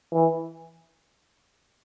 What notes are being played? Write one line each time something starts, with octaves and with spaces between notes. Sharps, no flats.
E3